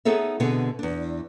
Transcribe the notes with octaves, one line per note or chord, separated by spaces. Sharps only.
B3 D#4 G#4 A4 C#5 E5
B2 D3 B3 C4 G#4
E2 D4